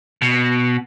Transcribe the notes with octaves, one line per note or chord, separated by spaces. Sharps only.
B2